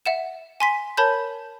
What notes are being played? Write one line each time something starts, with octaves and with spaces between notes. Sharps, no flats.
E5 F#5 E7
G#5 C6 B6
A#4 C#5 A5 B5 G6